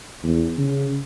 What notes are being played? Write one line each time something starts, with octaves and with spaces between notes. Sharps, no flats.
E2
C#3